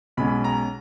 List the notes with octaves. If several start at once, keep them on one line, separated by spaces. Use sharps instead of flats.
B1 B2 G#3 C#4 B5
A#5